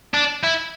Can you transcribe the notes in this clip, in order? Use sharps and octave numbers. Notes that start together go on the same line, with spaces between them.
D4
E4